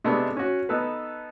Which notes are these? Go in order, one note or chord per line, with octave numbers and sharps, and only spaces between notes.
C3 G#3 A3 B3 D4 D#4
C#4 F#4
B3 D#4 A4 B4